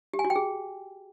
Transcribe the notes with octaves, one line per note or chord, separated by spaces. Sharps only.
G4
G#5
F#4
G5
G#4